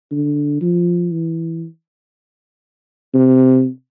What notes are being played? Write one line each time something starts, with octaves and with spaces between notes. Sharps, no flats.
D3
F3
E3
C3